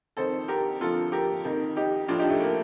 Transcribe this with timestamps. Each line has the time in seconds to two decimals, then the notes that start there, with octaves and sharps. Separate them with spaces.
0.17 F2 D#3 A4 C5
0.48 G4 A#4
0.81 F2 D3 F3 F4 A4
1.12 G4 A#4
1.45 F2 D#3
1.76 D#4 G4
2.08 A2 F3 D4 F4
2.18 D#4 G4
2.29 A3
2.40 A#3